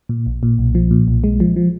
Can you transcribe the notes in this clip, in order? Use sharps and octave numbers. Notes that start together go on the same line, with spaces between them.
A#2
A#1
A#2
B1
F3
A#2
B1
G#3
F3
F3